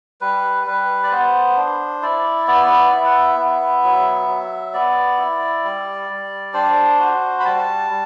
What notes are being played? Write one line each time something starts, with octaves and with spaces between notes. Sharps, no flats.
G3 B4
G3 B4
D5
B3 C5
D4
E4 D5
B3 D5
E4 E5
F#5
E5
B3
F#3
F#3
B3 D5
E4
G3
G3
D4 C5
F#4
B5
G3 A5
G3